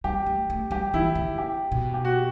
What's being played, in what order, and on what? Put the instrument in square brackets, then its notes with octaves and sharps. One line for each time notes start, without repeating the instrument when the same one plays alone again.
[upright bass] G3 [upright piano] G4
[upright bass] A3
A3
[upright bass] G3 [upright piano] G4
[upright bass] E3 [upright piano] E4
[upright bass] D3
[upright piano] G4
[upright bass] B2
[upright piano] G4
F#4